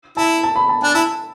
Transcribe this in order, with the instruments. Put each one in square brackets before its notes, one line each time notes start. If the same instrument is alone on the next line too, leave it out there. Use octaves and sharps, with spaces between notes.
[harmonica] E4 [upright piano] A5
[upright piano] A5
B5
A5
[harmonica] D4 [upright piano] G#5
[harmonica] E4 [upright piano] A5